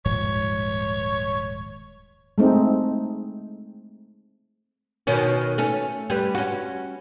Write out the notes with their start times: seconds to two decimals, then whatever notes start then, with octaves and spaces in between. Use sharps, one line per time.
0.05 D#1 G#2 F3 C#5
2.38 G#3 A3 C4 D#4
5.07 B2 D#3 C#4
5.58 A3 C#4
6.10 G3 B4
6.35 C#4 F#4